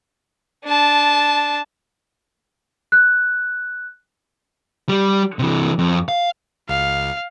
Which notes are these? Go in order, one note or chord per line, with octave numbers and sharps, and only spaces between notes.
D4 A5
F#6
G3
C3 E3
F2
F5
C#2 F5